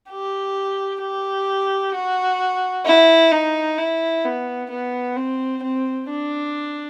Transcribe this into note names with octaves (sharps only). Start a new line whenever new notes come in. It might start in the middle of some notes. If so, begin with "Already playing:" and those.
G4
G4
F#4
E4
D#4
E4
B3
B3
C4
C4
D4